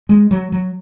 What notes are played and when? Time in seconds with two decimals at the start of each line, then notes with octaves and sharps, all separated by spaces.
0.09 G#3
0.31 F#3
0.52 F#3